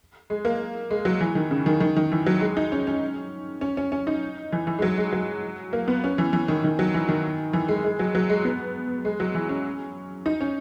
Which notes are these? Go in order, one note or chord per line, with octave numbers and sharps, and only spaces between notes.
G#3
A#3
G#3
F#3
E3
D#3
C#3
D#3
D#3
D#3
E3
F#3
G#3
D#4
C#4
C#4
C#4
C#4
C#4
D#4
E3
E3
G#3
F#3
G#3
F#3
A#3
B3
C#4
E3
E3
D#3
D#3
F#3
E3
D#3
E3
G#3
G#3
F#3
F#3
G#3
B3
G#3
F#3
E3
C#4
D#4
C#4